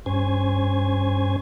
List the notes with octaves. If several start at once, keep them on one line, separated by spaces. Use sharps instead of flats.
G2 C#4 C5 G#5